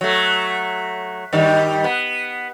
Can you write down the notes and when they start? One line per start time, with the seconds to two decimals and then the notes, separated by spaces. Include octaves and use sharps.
0.01 F#3 A3
1.33 G2 D#3 G3
1.84 B3